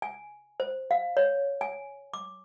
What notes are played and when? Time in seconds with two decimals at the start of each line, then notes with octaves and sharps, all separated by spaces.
0.02 G#5
0.60 C5
0.91 F5
1.17 C#5
1.61 G#5
2.14 D6